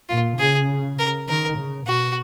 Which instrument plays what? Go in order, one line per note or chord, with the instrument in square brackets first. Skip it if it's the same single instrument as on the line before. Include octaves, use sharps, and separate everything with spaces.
[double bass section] A#2 [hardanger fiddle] F4
[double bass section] C#3 [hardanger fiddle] G#4
[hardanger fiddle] A#4
[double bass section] D#3 [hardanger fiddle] A#4
[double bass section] C#3
[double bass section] B2 [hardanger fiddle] F#4